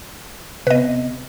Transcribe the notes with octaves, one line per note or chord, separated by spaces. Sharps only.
C3 B3 B4 D#5